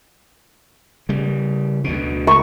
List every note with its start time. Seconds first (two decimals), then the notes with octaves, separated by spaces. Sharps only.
1.09 C#3 G3
1.84 D2 B2
2.27 C#2 C#6